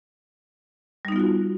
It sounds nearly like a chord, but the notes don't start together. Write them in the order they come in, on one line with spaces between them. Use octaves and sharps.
G3 D#4 B3 F4 F#4